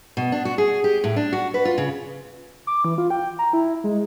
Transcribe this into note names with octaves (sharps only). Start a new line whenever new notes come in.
B2
D4
F#4
G#4
G4
A2
D4
F#4
B4
F4
C#3
D6
E3
F4
G5
A#5
E4
G#3